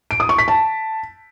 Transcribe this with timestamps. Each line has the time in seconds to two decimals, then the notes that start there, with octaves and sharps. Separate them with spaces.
0.11 D7
0.20 D#6
0.29 C#6
0.38 B6
0.48 A5